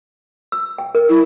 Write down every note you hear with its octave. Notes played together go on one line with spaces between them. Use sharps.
E6
G5
A#4
E4